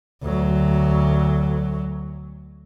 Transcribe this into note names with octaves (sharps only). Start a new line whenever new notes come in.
D2 F#3